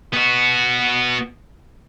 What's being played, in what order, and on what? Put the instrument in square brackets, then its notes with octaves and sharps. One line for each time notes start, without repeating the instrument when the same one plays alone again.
[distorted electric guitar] B3 F#4